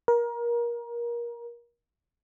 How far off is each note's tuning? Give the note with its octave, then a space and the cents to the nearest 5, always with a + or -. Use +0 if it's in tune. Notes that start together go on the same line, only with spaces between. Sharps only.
A#4 +25